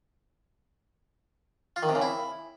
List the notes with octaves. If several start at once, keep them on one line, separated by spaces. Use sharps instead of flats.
F4
D#3
C3
C#3
E4